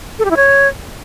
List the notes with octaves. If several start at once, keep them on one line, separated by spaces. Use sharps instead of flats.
A4
G4
E4
C#5